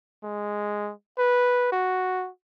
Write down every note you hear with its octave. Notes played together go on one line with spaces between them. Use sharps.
G#3
B4
F#4